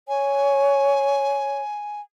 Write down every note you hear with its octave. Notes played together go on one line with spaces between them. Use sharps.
C#5 G#5